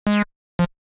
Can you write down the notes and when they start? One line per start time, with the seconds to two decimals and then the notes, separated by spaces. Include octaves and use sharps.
0.07 G#3
0.59 F3